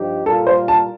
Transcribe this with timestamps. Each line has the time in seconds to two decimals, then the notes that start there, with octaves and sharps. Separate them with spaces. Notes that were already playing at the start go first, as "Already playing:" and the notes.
Already playing: G2 F3 D#4 G4
0.26 A#2 G3 A#3 F4 A4 A#4
0.47 C5
0.68 A5